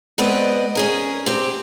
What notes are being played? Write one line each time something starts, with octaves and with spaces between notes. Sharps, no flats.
G#3 B3 C4 B4 D5 D#5
C#4 G#4 A#4
C4 G4